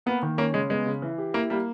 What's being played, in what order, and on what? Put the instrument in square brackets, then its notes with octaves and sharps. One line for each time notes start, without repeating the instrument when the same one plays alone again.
[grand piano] A#3 [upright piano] B3
[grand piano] D#3
[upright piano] A#3 [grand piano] C#4
[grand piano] C#3 [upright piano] G#3
[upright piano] G#3 [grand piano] B3
[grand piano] C#3
E3
G4
[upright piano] A#3 [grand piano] E4
[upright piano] G3 [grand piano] A#3